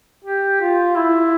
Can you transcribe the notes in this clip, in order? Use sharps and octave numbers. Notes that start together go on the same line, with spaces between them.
G4
F4
E4